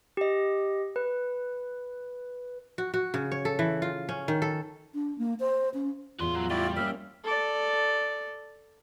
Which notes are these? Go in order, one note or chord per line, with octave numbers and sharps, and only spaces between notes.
G4 D#5
B4
F#4
F#4
C#3
C#5
A4
E3
F4
C#4
D#3
A4
D4
A#3
C5
C#4
E2 A2 F4 F#4 C6
F#3
G3 E4 F#4 D5
A#3 C#4 E5 F6
A4 D5